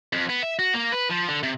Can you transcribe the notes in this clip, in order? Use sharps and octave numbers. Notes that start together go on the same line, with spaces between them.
F2
B3
E5
F#4
A#3
B4
F3
D3
C3